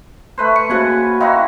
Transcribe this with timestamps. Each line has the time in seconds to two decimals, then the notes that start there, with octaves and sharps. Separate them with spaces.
0.38 A3 B4 C5
0.56 C#7
0.70 C#3 A#3 F#4 C5 F#5 G#5
1.21 D#4 E4 F#4 F5 G5 C6